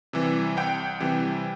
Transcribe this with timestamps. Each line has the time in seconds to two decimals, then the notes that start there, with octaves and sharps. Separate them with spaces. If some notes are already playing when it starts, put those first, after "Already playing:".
0.13 C3 E3 G3
0.57 C2 G5
1.00 C3 E3 G3